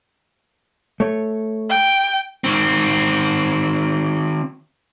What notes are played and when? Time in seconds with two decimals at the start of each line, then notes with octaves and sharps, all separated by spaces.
1.00 A3 C#5
1.70 G5
2.44 D#3 C4